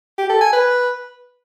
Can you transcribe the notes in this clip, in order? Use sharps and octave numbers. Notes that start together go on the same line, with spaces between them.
G4
A4
G#5
B4